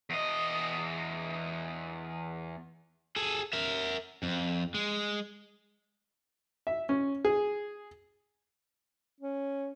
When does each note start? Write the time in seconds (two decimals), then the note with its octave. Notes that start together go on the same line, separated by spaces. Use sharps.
0.10 E2 D#5
3.16 G#4 A4
3.53 A#4 E5
4.23 F2
4.74 G#3
6.67 E5
6.89 C#4
7.25 G#4
9.21 C#4